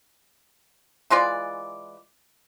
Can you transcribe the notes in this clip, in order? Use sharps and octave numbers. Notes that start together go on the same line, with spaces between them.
E3 G#3 F4 D5